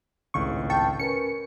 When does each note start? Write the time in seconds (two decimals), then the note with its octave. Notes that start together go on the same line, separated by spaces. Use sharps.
0.34 G#1 C#2 A2 C#6
0.70 G5 A5 C#6
0.99 C#4 A#4 B4 C#7